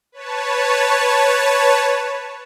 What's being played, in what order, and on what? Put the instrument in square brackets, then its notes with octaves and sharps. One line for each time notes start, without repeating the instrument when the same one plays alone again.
[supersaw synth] B4 C#5 A5